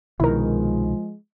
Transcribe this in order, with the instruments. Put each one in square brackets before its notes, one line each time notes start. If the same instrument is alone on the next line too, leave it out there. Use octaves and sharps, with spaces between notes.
[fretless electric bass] C2 B2 D#3 [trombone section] F3 G#3 [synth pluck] E4 A#4